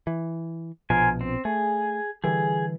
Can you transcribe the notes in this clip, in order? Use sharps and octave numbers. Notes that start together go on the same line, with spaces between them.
E3
A#1 B2 F3 A#4 C5 G#5
C4
A3 G#4
D3 E3 G3 G#4